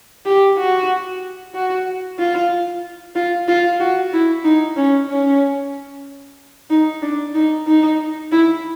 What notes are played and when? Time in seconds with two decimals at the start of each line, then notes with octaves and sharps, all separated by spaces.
0.26 G4
0.58 F#4
1.55 F#4
2.19 F4
3.15 F4
3.48 F4
3.80 F#4
4.13 E4
4.44 D#4
4.77 C#4
5.10 C#4
6.70 D#4
7.02 D4
7.34 D#4
7.67 D#4
8.31 E4